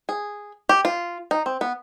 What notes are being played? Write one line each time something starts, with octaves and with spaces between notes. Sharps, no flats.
G#4
G4
F4
D#4
C4
B3